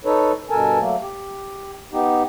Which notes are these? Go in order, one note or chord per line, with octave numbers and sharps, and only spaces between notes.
D#4 A4 B4 C#5
G2 B2 A4 A#4 G#5 A5
F#3 A3 A#3
G4
B3 D#4 G4